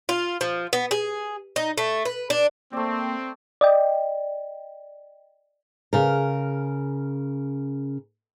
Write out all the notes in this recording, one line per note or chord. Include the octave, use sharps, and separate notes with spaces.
F4
F3
B3
G#4
D#4
A3
B4
D4
A3 A#3 C4 D5
D5 D#5 G5
C#3 A#4